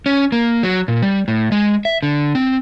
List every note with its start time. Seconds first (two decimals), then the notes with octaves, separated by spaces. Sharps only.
0.06 C#4
0.32 A#3
0.63 F#3
0.88 A#2
1.03 G3
1.28 A2
1.52 G#3
1.85 E5
2.03 D3
2.35 C4